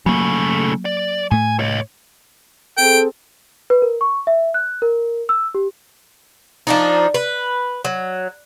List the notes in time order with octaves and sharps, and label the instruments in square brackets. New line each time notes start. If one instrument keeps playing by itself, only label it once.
[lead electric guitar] C#3 A3 [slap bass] F#3 A#3
[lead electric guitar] D5
[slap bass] A2 A3 [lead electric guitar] G#5
[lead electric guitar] C#5 D#5
[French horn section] C4 G#4 A4 [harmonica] G5
[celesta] B4
A#4
C#6
E5
F#6
A#4
E6
G4
[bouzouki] F3 D4 D#4
B4
F#3